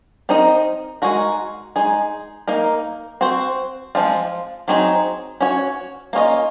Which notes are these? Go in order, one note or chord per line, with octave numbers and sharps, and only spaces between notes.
C4 D#4 A#4 D#5
G#3 D#4 F#4 A#4
G#3 D#4 G#4
A#3 D#4 A#4
C4 F#4 C5
F3 G#3 C4 F4
F#3 C4 D#4 G#4
C#4 F#4 C#5
A#3 C#4 F4 G#4 D#5